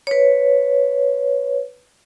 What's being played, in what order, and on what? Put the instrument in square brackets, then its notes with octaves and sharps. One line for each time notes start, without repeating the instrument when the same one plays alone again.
[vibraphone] B4 C#5